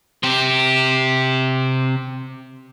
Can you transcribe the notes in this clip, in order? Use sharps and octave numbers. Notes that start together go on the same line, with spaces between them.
C3 G4